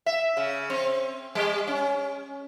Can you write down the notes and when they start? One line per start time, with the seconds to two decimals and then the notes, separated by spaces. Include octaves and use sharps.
0.06 E5
0.37 C#3
0.70 C4
1.35 G3
1.67 C#4